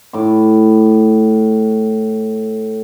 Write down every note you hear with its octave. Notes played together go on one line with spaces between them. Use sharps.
A2 D6